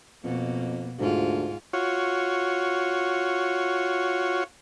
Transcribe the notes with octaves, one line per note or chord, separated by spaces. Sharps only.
F2 B2 A#3
D2 G#2 F4
F4 F#4 C#5